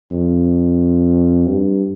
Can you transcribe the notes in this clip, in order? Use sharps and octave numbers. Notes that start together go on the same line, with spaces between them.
F2
G2